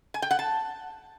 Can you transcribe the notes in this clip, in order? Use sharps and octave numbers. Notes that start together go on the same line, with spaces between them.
G#5
G5
F#5
A5